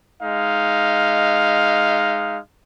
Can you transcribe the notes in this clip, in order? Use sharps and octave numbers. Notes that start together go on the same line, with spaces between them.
G#3 D#4 F5